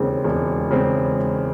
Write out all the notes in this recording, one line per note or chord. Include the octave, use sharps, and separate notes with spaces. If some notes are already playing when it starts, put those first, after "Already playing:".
Already playing: E1 D#2 C#3 G#3 C4
E1
C#3 G#3 C4